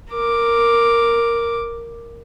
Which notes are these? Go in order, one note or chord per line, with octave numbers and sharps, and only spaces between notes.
A#4 D6